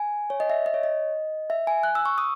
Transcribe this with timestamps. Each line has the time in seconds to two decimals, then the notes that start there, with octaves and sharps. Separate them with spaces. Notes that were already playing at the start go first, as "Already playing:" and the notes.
Already playing: G#5
0.30 C#5
0.40 D#5
0.50 E5
0.66 D#5
0.74 C#5
0.83 D#5
1.50 E5
1.67 G#5
1.83 F#6
1.95 E6
2.05 C#6
2.18 D#6